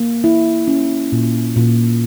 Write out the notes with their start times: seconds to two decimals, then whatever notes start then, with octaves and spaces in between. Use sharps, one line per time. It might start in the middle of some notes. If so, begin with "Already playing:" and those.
Already playing: A#3
0.24 E4
0.68 C#4
1.12 A#2
1.56 A#2